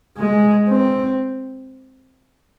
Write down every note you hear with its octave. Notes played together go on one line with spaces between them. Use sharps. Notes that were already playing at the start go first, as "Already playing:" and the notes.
G#3
C4